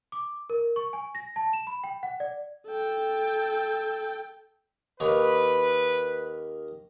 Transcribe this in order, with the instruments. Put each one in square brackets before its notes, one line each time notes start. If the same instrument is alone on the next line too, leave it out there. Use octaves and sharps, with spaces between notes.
[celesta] D6
A#4
C#6
G#5
A#6
A5
E7
B5
G5
F#5
D5
[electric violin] A4 G5
[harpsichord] D#2 D#3 C#5 [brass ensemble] B4